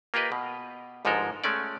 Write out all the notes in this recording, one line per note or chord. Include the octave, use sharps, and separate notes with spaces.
A#3 F4 G4 A#4 B4 D#5
B2
G1 G#2 F3 G#3 A4 A#4
G#3 A3 C#4 D5